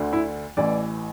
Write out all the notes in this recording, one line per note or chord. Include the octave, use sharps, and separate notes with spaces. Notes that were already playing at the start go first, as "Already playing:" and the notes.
Already playing: D2 D3
E4
A1 A2 E3 D5